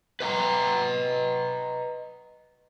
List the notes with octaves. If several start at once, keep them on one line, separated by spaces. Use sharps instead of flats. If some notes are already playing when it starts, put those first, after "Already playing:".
B4 D#5 G#5 A#5